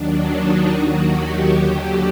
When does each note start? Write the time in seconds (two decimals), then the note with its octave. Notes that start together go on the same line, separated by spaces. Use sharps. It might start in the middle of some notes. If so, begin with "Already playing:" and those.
Already playing: D#2 D#3 F#3 D4
0.28 D#4
0.69 D#2 D#3 F#3 F#4
1.11 G4
1.52 D#2 D3 F#3 G4